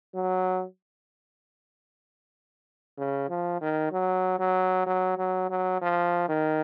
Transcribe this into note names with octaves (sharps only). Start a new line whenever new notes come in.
F#3
C#3
F3
D#3
F#3
F#3
F#3
F#3
F#3
F3
D#3